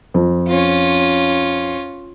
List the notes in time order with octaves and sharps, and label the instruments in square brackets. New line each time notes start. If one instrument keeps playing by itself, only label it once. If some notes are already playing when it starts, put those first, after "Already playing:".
[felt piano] F2
[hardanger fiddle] C#4 F4